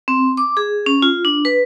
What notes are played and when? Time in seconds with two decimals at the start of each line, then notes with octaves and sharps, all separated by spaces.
0.08 C4
0.37 D6
0.57 G#4
0.86 C#4
1.02 F4
1.25 D4
1.45 B4